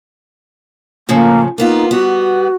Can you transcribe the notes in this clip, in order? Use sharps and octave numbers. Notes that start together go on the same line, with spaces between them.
A2 C#3 F3 A#3
A#3 B3 D#4 F4
G3 B3 F#4